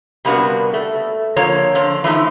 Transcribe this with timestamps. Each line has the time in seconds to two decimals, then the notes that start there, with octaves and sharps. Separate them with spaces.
0.25 C3 G3 A#3 B3 D4 F#4
0.74 A3
1.36 D3 F3 A#3 C#5
1.75 D3 F3
2.04 E3 F3 A3 D#4